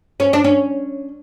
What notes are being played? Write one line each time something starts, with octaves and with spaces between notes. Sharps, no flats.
C#4
D4
C#4